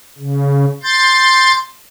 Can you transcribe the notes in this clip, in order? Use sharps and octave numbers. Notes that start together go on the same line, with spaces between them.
C#3
C6 G6 A6